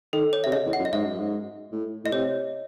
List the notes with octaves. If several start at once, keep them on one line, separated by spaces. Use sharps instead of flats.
D#3 A4
C#5
C3 E5
C#3 D#5
E2
F#5
F#2
D#5
G#2 E5
F#2
G#2
A2
A2 D#5
C3 C#5